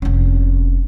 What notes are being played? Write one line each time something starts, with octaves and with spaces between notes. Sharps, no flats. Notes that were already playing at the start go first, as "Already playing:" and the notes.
F1 C#4